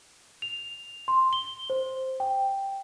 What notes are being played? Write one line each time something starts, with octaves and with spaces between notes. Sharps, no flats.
F7
C6
G7
C5
G5